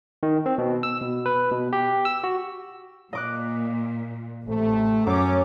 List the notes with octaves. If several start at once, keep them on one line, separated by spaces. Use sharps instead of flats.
D#3
C4
B2
E6
B2
B4
B2
G4
E6
F#4
A#2 D#5 D6 F#6
A1 C3 A3
F#2 C#4 D6